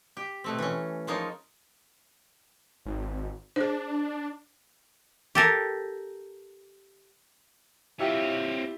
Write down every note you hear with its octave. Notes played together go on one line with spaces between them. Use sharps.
G4
B2 A3 C4
E3 C#4
F3 G#3 A#3 D#4 F4 C#5
G#1
D4 G#4 C5
G4 A4 A#4
C4 E4 F4 G4 C#5